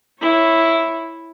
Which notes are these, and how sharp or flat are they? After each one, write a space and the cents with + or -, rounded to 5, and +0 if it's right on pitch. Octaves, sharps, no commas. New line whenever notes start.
E4 +0 C#5 -10